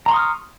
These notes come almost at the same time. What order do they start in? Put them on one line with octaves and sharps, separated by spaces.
A#5 C6 C#6 D#6 F6